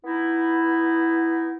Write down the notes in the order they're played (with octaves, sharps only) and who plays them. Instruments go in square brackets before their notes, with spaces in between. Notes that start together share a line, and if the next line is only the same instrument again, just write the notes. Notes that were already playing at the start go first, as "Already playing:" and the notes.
[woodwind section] B3 D#4 E4